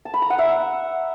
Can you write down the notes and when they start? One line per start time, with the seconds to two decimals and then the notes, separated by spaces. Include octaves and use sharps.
0.05 A5
0.14 B5
0.22 A#5
0.30 F#5
0.39 E5